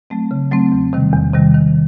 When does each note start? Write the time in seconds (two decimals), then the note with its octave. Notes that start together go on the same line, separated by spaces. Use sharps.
0.10 F#3 A3 C4
0.31 C#3
0.51 F#3 A3 C4
0.72 E2
0.93 C3 D#3 G3
1.14 E2
1.34 C3 D#3 G3
1.54 D#3